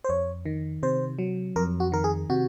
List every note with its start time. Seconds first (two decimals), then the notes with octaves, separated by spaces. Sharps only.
0.04 C5
0.09 F2 C#5
0.46 D#3
0.83 C3 C5
1.19 F#3
1.56 F2 A#4
1.80 F#4
1.92 D#3 A#4
2.04 G#4
2.30 C3 F#4